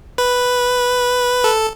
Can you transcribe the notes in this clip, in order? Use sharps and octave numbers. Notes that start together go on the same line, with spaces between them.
B4
A4